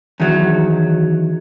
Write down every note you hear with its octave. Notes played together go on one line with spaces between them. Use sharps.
E2 D#3 F#3